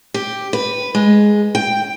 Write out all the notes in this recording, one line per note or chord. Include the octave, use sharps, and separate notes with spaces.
G4
B4
G#3
G5